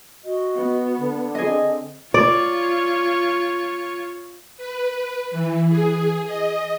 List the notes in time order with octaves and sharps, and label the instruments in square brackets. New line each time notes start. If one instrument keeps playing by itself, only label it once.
[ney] F#4 [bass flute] D#5
[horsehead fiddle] B3
[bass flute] D3
[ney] C4 [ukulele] G#4 D#5
[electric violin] F4 C#5 [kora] D5
[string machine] B4
E3
G#4
D#5